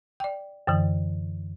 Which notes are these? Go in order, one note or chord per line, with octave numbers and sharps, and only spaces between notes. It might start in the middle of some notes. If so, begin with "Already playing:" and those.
D5 G5
F#2 D3 E3